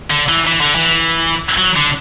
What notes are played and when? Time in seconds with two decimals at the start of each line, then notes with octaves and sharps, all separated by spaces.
0.10 D3
0.29 E3
0.47 E3
0.61 D3
0.75 E3
1.58 F#3
1.77 D3